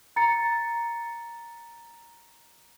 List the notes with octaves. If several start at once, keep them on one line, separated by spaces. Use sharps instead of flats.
A#5 A6 C#7